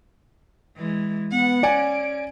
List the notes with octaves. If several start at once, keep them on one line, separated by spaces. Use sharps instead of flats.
E3 G#3
B3 F#5
C#4 D5 G#5 D7